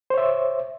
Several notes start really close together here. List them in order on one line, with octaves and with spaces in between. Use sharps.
C5 C#5 E5